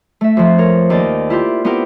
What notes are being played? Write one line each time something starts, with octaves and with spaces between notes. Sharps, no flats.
A3 E5
F2 F3
A#4 C#5
D#2 D5 D#5
E4 F4 G4
B3 C4 E4 G4 A#4 G5